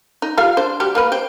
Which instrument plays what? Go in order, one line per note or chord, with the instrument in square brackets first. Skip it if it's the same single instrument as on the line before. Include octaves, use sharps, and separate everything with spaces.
[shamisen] D#4
G3 F4 F5
D4 C5
G3 F#4 G4
A#3 A#4 B4
C5 G5